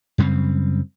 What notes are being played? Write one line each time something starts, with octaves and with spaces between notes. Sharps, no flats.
F#2 C#3 G3 C4